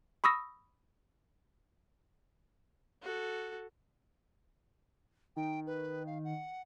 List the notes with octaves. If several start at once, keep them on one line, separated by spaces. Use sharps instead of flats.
B5 C#6 D#6 E6 A#6
F#4 A4
D#3 G5
B4
F5
F#5